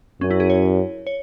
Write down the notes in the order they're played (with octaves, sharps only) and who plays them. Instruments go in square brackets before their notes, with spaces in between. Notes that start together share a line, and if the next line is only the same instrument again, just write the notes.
[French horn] F#2 [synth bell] C#4
[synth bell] E4
G#4
C#5
C#5